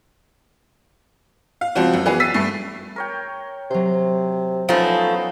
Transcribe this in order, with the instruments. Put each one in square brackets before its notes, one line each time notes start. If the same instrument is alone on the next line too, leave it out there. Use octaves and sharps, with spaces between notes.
[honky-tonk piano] F5
C#2 F3 C4 F#4
F#2
E3 B3 F#4 G#4
E6 A6 B6 C7 D#7
G2 A3 C7
[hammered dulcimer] A#4 C#5 G5
[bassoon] C3 [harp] F#3 C5
[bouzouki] F3 A3 [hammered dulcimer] B3 C#4 D#4 [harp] A#5